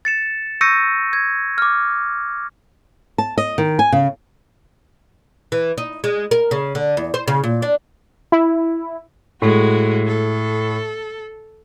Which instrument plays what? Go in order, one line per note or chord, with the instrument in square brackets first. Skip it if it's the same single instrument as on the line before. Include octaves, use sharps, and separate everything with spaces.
[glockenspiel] A6 C#7 E7
C#6 E6 G6 A#6 C#7 D#7
G#6
D6 F6
[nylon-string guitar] A5
D#5
D#3
G#5
C#3
[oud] E3
D#4
G#3
A#4
C#3
D3
E2
C5
C#3
A#2
D4
[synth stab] E4
[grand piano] A2 [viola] G#3 F#4
[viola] A4